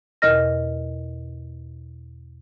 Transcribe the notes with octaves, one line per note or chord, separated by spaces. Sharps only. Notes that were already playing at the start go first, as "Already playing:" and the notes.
E2 B2 A#4 D#5 F6 A#6